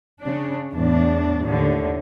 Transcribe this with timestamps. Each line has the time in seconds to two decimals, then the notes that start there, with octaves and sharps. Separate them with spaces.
0.21 C#3 D4
0.74 E2 A2 D4
1.44 D#2 A2 D3